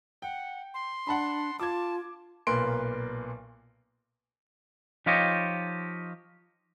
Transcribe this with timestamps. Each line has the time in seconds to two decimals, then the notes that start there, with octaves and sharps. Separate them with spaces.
0.22 F#5 G5
0.74 C6
1.07 D4 F#5 A5 B5
1.60 F4 A5 D6 G#6
2.47 B1 A#2 A#3 B4 C6 D7
5.06 F3 D#4 F4 G4 C#5 D#5